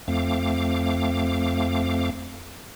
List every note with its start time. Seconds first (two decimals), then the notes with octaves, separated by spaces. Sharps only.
0.08 F2 A3 C4 F5 D6